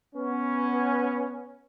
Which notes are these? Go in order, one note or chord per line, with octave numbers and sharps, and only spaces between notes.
B3 C#4